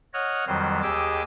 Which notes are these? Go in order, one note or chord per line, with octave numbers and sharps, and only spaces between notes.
C#5 D#5 F#5 F6
F2 D#3 F#3 G3 C5
D#2 G4 G#4 D#5 D6 E6